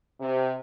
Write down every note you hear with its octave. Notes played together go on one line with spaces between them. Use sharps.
C3